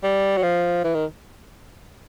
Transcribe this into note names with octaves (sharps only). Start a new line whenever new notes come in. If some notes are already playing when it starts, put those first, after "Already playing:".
G3
F#3
F3
E3
D#3